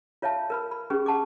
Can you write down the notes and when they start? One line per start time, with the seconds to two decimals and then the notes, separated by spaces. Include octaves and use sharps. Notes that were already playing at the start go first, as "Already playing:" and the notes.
0.22 F4 C#5 E5 F5 A5
0.50 A#4 B4 B5
0.71 B5
0.90 C#4 G4 G#4 B4 C#6
1.06 F#5 A5 C#6 D6